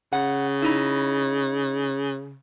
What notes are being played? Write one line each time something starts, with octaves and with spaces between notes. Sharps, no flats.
C#3 F#5
D#4 E4